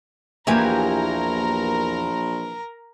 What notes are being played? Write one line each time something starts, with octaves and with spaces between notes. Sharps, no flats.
A#1 E2 E3 A#3 G4 A#4 G#5 A#5